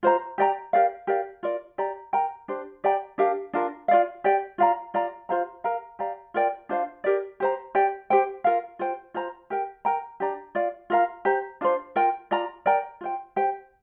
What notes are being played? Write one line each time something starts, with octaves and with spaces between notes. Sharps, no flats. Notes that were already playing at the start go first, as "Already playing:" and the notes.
F4 C5 A#5
G4 D5 G5 A#5
G4 A#4 D5 F5
G4 A#4 D5 F5
F4 A#4 D5
G4 D5 A#5
A#4 G5 A#5
D4 G4 C5
G4 D5 G5 A#5
D4 G4 A#4 F5
D4 F4 A#4
F4 D5 F5
G4 D5 G5
F4 D5 F5 A#5
F4 D5 F5 A#5
F4 C5 F5 A#5
A#4 F5 A#5
G4 D5 F5 A#5
F4 A#4 D5 G5
D4 F4 C5 F5
G4 A#4 D5
G4 C5 A#5
G4 D5 G5
G4 C5 G5
F4 A#4 F5
F4 C5 G5
F4 C5 A#5
G4 A#4 G5
A#4 G5 A#5
D4 G4 D5 A#5
F4 D5 F5
F4 A#4 F5 A#5
G4 C5 A#5
D4 F4 C5
F4 A#4 G5
F4 D5 A#5
A#4 D5 G5 A#5
F4 C5 G5
G4 C5 G5